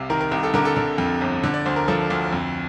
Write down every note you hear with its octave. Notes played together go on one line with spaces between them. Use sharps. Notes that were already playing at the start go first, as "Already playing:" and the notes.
Already playing: C2 C3 F5
D#3 A#4
A#4
C2 A#4
A4
D3 A#4
A4
D3 A#4
F2
G1
D3
D5
D2 C5
A#4
F3 A4
D2
F2